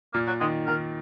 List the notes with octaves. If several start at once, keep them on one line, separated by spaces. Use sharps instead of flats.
A#2 A#3
F#3
D#3 G#3
D#3 A#4